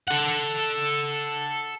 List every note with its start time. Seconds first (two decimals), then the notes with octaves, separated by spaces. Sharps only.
0.08 A4 F#5